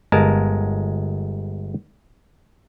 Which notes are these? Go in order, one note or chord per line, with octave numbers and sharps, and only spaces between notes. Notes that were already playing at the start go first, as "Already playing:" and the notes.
G1 G#3 A#4 A5